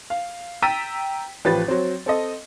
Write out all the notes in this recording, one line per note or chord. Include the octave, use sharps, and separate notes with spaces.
F5
G5 A#5 E6 A6 B6 D#7
A1 F3 G4 B4 A6
F#3 C4
C4 A4 D#5